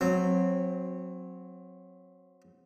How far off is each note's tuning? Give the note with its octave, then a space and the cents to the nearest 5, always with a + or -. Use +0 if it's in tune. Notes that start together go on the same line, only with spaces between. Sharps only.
F#3 -20 C4 +0